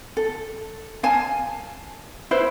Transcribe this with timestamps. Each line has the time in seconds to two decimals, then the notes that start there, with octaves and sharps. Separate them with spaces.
0.17 A4
1.03 F5 G#5 A5
2.31 E4 B4 C5